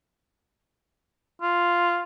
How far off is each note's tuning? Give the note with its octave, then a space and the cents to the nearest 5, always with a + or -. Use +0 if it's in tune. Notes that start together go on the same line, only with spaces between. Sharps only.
F4 -5